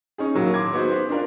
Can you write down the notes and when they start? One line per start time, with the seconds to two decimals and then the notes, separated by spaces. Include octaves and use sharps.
0.18 C#4 D#4 G#4
0.34 D#2 A2 F#3 A#3
0.54 C6 D6 G#6
0.73 B3 D#4 F#4 G#4 C5
0.89 B4 C5
1.09 D4 F4 A#4 D5